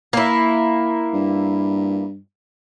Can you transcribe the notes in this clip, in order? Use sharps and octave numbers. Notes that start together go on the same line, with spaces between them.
A#3 E4
G2